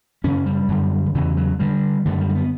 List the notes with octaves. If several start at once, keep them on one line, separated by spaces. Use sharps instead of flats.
F#2 C#3 C#4
G3
F#2 D3
D3
E2 C#3 E3
F#3
G2 D3 G3
F#2 D3 A3
G3
A3
B3